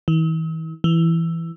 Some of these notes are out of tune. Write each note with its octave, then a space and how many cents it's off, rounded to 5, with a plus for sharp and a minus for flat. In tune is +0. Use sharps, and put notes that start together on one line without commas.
E3 -45
E3 +5